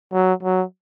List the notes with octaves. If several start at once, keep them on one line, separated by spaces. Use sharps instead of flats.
F#3
F#3